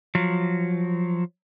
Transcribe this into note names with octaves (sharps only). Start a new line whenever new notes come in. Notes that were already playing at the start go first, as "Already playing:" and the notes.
F3 F#3